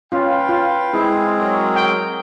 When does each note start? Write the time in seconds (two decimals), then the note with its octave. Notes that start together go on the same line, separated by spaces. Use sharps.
0.12 C#4 F4 B4 F5 G5
0.49 F4
0.94 G#3 C4 E4 G#4
1.39 F#3 A#4
1.76 G5